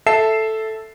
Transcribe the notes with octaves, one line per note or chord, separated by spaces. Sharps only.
A4 E5 A5 C7 E7